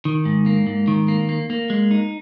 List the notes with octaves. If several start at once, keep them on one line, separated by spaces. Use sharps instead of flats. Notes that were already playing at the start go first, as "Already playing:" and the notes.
D#3
G#2
A#3
G#2
D#3
A#3
A#3
A#3
G#3
D#4